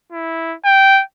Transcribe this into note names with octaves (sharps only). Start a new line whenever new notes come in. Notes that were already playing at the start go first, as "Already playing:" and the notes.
E4
G5